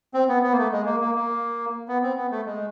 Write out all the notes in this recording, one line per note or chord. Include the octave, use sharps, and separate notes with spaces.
C4
B3
B3
A#3
A3
G#3
A#3
A#3
A#3
B3
C4
B3
A3
G#3